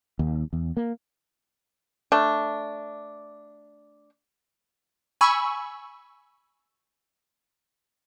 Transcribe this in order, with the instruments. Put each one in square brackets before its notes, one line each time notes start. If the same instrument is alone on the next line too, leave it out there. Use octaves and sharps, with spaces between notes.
[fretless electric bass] D#2
E2
A#3
[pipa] A3 D4
[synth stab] G#5 B5 C#6 E6